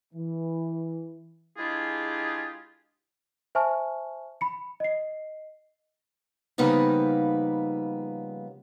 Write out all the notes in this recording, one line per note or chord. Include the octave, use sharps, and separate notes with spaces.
E3
G#3 D4 E4 F4 G4 G#4
C5 E5 G#5 A5 C#6 F6
B5 C#7
D#5 C7
C#3 F3 G3 A#3 B3 D#4